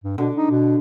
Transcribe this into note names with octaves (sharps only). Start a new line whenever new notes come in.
G2
B2 D3
D#4
B2